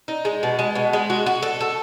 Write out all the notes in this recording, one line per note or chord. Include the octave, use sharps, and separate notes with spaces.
D#4
G#3
B2
G#3
B2
G#3
F#4
F#4
A4
A4